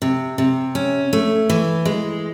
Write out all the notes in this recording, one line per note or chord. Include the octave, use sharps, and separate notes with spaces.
C3
C3
C#4
A3
E3
G#3